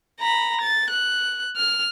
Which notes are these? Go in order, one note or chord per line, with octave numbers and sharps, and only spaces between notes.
A#5 B5
A6
F#6
F6